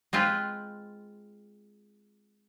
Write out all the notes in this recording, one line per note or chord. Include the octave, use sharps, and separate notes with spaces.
G#3 C4 F4 B4